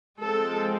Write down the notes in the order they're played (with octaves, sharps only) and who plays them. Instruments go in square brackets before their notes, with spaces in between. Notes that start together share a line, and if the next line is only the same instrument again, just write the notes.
[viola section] F3 G#3 C4 A4